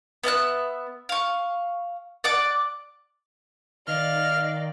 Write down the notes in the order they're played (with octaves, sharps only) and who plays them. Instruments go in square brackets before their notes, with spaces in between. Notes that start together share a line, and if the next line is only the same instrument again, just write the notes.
[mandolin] B3 E5 A5 F#6
F5 C#6
D5 F#5 D6
[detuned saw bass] D#3 [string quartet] D5 F5 [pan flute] D#5 [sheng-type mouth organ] F6